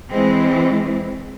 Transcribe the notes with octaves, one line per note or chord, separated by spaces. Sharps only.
E3 G#3 C4